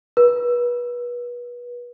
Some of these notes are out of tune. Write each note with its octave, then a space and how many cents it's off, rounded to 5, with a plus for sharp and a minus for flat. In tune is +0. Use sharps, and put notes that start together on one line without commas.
B4 -30